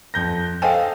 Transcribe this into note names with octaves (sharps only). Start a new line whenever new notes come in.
F2 G6 A#6
A4 C5 D#5 F5 G5 G#5